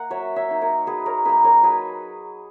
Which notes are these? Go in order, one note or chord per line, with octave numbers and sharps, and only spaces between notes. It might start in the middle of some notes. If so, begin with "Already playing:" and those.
Already playing: A#3 F#5 A#5
F#3 C#5 E5
C#5 E5
A#3 D#4
A#4 C#5
F#3 G#4 B4
A#4 C#5
A#3 D#4 G#4 B4
A#4 C#5
F#3 G#4 B4